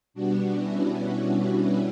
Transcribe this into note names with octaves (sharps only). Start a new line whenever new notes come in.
B2 G3 B3 D4 F#4
C#4 E4
D4